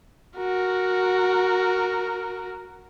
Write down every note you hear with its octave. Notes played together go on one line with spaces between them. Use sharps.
F#4 A#4